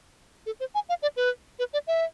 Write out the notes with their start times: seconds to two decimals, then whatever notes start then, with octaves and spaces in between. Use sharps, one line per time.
0.46 A4
0.60 C5
0.74 G#5
0.89 F5
1.02 D5
1.16 B4
1.59 B4
1.73 D5
1.87 E5